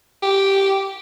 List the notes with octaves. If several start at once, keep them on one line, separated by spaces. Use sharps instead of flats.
G4